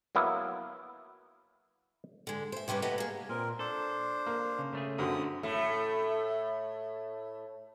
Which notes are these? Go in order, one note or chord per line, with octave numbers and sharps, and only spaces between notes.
F#3 A#3 B3 E4
D3 G#3
C5 E5
C3 G3 C#4 G4 B4
A3 B3 G4 B4 D#5 F#5
A#3 G#4
A#2 C4 A#4
D4 A4 C5
A#3
C#3
C#3 A3 G#4
F#2 D3 F#3 C4 D#6
A2 A3